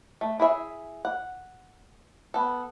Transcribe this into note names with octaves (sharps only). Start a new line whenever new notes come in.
A3
E4 G#4 E5
F#5
B3 A4